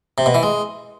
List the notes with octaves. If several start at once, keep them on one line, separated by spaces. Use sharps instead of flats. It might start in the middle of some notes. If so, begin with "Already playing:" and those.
C3
B2
E3
G#3